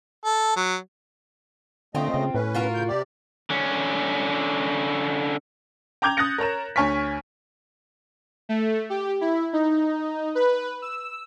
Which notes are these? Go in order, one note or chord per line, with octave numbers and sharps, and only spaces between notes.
A4
F#3
A#2 D3 A3 C4 F4 D#5
C#3
A2 C#4 B4
F4 F#4 A#4
C#3 G6
C3 G4 D5
D3 C#4
G5 A#5 D6 G6 G#6 F7
D#6 F#6 A6 A#6 C#7
A#4 C#5 A#5 E7
D2 C#5 G#5 C#6 F6 B6
A3
G4
E4
D#4
B4
E6